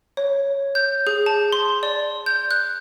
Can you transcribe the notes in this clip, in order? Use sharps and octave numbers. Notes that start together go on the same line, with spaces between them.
C#5
G6
G#4
A5
C6
D5
G6
F#6